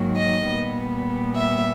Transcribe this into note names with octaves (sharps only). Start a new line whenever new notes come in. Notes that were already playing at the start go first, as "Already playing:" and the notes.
Already playing: G#2 D#3 F#3 A#3
D#5
A#2 G3 B3
E5